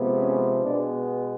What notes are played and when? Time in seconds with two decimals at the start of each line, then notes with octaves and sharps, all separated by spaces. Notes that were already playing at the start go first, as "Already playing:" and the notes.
Already playing: C3 F3 G#3 B3
0.20 C#4
0.65 B2 G#3 B3 D4